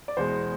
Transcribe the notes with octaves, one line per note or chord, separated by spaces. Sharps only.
D5
E2 B2 G#3 C5